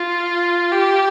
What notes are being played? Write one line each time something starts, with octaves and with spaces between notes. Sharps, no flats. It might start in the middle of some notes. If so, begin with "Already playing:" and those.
Already playing: F4
G4